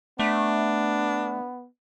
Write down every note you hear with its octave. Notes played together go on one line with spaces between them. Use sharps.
A3 B3 D4